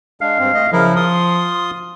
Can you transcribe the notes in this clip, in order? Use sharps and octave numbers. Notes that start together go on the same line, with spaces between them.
G#3 D4 F5
G2 C4
A3 D#5
C#3 F3 E4 A#4
F4 C6 D#6